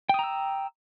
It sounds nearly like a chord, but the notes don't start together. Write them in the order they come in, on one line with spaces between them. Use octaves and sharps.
G5 D#6 A#5 E6